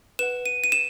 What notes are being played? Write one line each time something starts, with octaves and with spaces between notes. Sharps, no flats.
B4 F#5 E7
D#7
D#7
E7